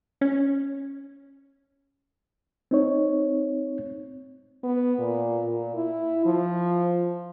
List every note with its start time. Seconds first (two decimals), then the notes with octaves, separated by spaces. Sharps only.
0.21 C#4
2.71 C4 D#4 C#5
4.63 B3
4.99 A#2
5.44 A#2
5.75 E4
6.26 F3